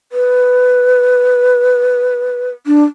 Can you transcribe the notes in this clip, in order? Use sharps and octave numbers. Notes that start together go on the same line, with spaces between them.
B4
D4